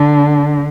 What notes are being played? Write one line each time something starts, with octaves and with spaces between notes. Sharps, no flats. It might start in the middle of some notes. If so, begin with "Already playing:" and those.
Already playing: D3